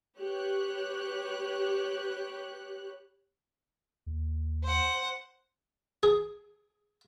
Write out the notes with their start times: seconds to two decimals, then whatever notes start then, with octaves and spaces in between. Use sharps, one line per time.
0.18 G4 B4 C#5 F#6
4.06 D#2
4.64 C5 F#5
6.03 G#4